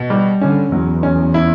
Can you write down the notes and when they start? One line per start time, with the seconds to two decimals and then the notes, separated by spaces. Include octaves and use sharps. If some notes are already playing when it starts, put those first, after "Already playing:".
Already playing: B2
0.10 G3
0.41 D3 C#4
0.72 E2 F#3
1.03 C#4
1.34 E4